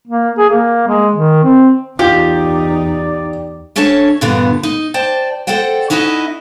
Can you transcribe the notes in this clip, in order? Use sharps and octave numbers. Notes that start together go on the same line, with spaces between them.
A#3
G#4
A#3
G#3
D#3
C4
E2 D#4 F4 G4 D5
D2 C#4 D4 A4 C#5 A5
G2 A#2 D3 E3 B3
D#4
C5 D5 G5 A5
A4 C5 D5 F#5 G5
C#4 D#4 E4 F#4 A#4 D#5